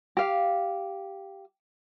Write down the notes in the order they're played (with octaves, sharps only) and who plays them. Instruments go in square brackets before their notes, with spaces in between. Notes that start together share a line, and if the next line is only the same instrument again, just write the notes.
[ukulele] G4 F5